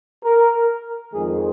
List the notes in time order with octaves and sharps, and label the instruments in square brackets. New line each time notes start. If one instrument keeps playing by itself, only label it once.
[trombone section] A#4
F2 D#3 G#3 G#4